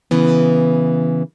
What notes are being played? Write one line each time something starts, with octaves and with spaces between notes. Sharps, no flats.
C#3 E3 B3